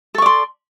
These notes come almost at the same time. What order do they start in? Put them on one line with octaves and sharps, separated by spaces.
A4 C#6 D5 C6